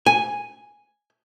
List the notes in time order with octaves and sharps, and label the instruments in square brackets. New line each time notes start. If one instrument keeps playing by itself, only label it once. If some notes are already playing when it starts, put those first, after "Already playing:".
[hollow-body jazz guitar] G#5